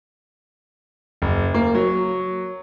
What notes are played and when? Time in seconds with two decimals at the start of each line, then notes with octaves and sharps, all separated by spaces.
1.22 F#1
1.54 A#3
1.75 F#3